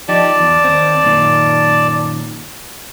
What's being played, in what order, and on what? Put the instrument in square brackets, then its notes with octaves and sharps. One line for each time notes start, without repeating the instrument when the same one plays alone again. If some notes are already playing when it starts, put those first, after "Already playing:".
[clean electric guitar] F3 D#4 G4 [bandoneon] D5 A5
[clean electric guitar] E2
D#2 C4
F#2 A#2 D#3